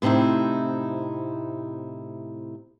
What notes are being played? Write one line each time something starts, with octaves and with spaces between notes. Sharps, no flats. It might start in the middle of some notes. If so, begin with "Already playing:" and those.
A2 C3 C4 D#4 E4